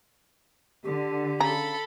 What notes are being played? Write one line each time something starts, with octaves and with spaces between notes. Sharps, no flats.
D3 G4
C#3 A4 A#5 B5